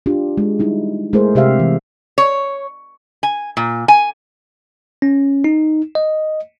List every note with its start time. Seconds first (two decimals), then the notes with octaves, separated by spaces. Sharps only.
0.06 D4 F4 G4
0.38 G#3
0.59 G3 D#4 E4
1.13 G#3 A3 E4 G#4 A#4 C5
1.35 C3 G4 C5 E5 F5
1.60 E3
2.18 C#5
3.23 G#5
3.57 A#2
3.88 G#5
5.02 C#4
5.44 D#4
5.95 D#5